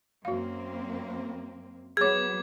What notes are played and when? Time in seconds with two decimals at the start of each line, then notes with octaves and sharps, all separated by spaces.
0.25 F#2 A#3 C4 F#4 F5
1.97 F#3 B3 G#4 C#5 D6 G#6